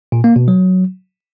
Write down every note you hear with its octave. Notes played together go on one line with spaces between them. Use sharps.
A#2
A#3
B2
F#3